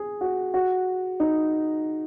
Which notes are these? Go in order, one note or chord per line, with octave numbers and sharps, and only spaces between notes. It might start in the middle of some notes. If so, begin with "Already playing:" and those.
Already playing: G#4
F#4
F#4
D#4